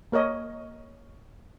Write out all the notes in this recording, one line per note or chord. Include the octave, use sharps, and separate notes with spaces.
A#3 A#4 C#5 D#5